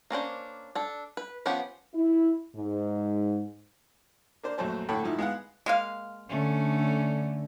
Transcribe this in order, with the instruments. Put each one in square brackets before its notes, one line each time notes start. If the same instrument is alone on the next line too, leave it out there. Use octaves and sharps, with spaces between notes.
[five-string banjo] A#3 C#4 D4 C5
D4 A4
B4
F3 B3 C#4 G4 F#5
[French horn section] E4
G#2
[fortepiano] A#3 D4 C5
A#1 F#2 F#3 A3 C5 A5
A2 D3 A4 C#5 G5 B5
G2 F3 D#4 E4
G#3 B3 F5 F#5
[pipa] G#3 A#3 F5
[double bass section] D3 [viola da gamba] A3 C#4